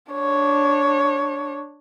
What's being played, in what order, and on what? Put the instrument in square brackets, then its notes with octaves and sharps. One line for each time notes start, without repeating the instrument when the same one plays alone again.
[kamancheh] D4 C#5